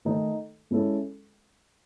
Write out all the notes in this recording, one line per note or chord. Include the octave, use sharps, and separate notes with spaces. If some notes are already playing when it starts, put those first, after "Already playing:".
D#3 A3 D#4 A4
G#3 C#4 E4 A4